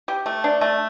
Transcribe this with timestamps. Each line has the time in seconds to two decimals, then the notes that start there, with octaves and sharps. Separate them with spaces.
0.08 G4
0.26 A3
0.44 D4
0.61 A3